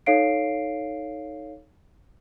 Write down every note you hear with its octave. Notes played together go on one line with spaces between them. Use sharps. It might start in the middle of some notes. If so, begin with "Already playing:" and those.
D#4 A4 C#5 F5 C7 D7